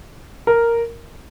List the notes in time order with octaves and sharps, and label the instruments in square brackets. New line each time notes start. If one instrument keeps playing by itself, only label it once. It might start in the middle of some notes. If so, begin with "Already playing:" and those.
[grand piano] A#4